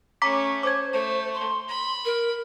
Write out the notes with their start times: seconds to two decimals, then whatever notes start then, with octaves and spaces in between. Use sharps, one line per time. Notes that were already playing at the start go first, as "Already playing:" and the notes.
0.22 A3 C#4 A#5 D6 B6
0.63 C5 D6 G#6
0.93 A3 C5
1.34 C6
1.68 B5
2.05 A#4